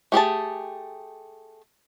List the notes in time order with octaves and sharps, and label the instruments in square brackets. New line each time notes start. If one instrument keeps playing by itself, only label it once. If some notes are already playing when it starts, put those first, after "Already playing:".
[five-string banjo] A3 G4 G#4 A5